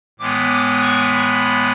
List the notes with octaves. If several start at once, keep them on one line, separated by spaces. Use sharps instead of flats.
A2 E3 G#3 B3 D6
D6
C#6
B5